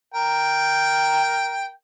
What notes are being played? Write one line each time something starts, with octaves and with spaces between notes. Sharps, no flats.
A#4 G5